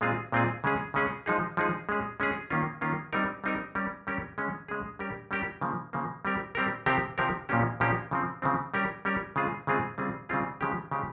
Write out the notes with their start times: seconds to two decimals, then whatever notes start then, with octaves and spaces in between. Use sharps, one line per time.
0.01 A#2 G#3 C4 F4 G#4
0.32 A#2 G#3 C4 F4 G#4
0.64 C#3 G#3 C#4 G#4
0.94 C#3 G#3 C#4 G#4
1.26 F3 G#3 D#4 G#4
1.57 F3 G#3 D#4 G#4
1.89 G#3 C#4 G#4
2.20 G#3 C#4 G#4
2.50 D#3 A#3 C#4 F4
2.81 D#3 A#3 C#4 F4
3.13 G3 C4 D#4 A#4
3.44 G3 C4 D#4 A#4
3.75 G3 C#4 G4 A#4
4.07 G3 C#4 G4 A#4
4.38 C#3 G#3 C#4 G#4
4.68 C#3 G#3 C#4 G#4
4.99 G3 C#4 G4 A#4
5.31 G3 C#4 G4 A#4
5.61 C#3 F3 A#3
5.93 C#3 F3 A#3
6.25 G3 C4 G4 A#4
6.55 G3 C4 G4 A#4
6.86 C3 F3 C4 G4 A#4
7.18 C3 F3 C4 G4 A#4
7.49 A#2 F3 A#3 C#4 G4
7.80 A#2 F3 A#3 C#4 G4
8.11 C#3 F3 C4
8.42 C#3 F3 C4
8.74 G3 C#4 G4 A#4
9.05 G3 C#4 G4 A#4
9.36 C#3 G#3 C4 F4 G#4
9.67 C#3 G#3 C4 F4 G#4
9.98 C#3 G3 C4 F4 G#4
10.29 C#3 G3 C4 F4 G#4
10.61 C#3 F3 G#3 C#4 G4
10.91 C#3 F3 G#3 C#4 G4